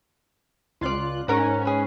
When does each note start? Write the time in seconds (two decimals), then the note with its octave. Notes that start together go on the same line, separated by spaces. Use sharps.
0.81 C#2 F4 D5 C6 F#6
1.28 G#2 C#4 A#4 F#5
1.65 G#4 B4